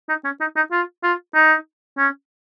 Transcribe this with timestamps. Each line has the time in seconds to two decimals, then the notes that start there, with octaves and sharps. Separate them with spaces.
0.09 D#4
0.24 C#4
0.41 D#4
0.56 D#4
0.72 F4
1.03 F4
1.35 D#4
1.98 C#4